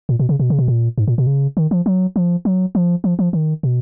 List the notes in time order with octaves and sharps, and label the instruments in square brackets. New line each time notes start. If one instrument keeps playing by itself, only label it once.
[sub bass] A#2
B2
C#3
B2
C#3
B2
A#2
G#2
A#2
B2
C#3
D#3
F3
F#3
F3
F#3
F3
F3
F3
D#3
B2